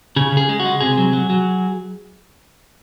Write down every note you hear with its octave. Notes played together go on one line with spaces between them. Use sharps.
C#3 G#4
C#3 G#4
G#3
F#4
G#3
C3 G#4
F#3
F#3
F#3